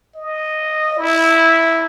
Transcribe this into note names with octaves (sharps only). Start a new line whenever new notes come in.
D#5
E4